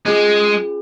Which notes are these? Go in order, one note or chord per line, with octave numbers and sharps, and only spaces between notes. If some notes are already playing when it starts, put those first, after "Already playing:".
G#3 C#4 F4 G#4